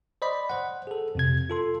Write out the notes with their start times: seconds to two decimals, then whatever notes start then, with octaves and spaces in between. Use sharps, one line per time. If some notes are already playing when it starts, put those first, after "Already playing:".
0.22 C5 D5 D#5 B5
0.50 C5 F#5
0.87 G#4 A4
1.15 F2 C3 G#6
1.50 F4 A4 C6